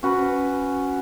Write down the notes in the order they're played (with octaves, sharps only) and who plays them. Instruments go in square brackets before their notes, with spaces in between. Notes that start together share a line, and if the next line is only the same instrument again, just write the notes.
[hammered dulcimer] C#4 F#4 B4